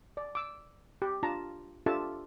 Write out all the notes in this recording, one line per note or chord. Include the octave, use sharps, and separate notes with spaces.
D5
D6 E6
G4
D4 F4 A5 A#5
D4 F4 G4 A4 E5 A5